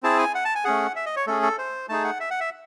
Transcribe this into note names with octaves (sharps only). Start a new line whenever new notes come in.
C4 E4 G#4 A5
G#5
F#5
A5
G#5
A3 C#4 G#4 F#5
E5
D#5
C#5
A3 C#4 G#4 A4
A4
C5
A3 D#4 G#4 A5
F#5
E5
F#5
E5